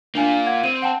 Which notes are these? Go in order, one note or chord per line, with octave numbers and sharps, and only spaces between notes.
A#3 D4 F4 G#5
F#5 G#6
C4 D#7
F#5 G5 A5